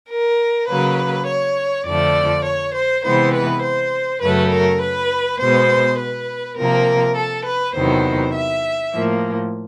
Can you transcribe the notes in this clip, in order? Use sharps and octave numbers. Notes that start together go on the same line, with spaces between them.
A#4
C#3 F#3 A#3 B4
C#5
F2 D3 F3 A3 D5
C#5
C5
C3 E3 G#3 B3 C5
B4
C5
F#2 C#3 F#3 A3 B4
A#4
B4
B2 G#3 B3 C5
B4
C3 F3 A#3 A#4
A4
B4
E2 C3 D#3 F#3 B3 C5
E5
A2 F3 A#3